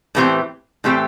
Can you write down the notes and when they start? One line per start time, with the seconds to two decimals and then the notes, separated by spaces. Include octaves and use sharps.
0.15 A2 E3 A3 C4 G4
0.84 A2 E3 A3 C4 G4